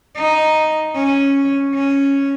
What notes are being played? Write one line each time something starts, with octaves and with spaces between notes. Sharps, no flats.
D#4
C#4
C#4